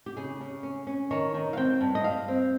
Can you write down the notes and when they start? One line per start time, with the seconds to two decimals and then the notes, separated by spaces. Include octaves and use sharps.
0.06 G4
0.17 C#3 G#4
0.41 C#3
0.63 C#4
0.87 C#4
1.11 D#3 C#5
1.34 D#3
1.53 F5
1.57 C4 G5
1.81 G2
1.95 D#5
2.04 G3 F5
2.28 C4